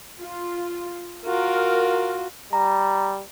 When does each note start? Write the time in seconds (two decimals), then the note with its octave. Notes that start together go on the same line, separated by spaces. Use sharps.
0.21 F4
1.26 F4 F#4 A#4
2.53 G3 A#5